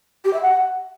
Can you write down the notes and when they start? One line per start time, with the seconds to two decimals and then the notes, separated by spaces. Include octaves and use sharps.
0.25 G4
0.33 E5
0.42 F#5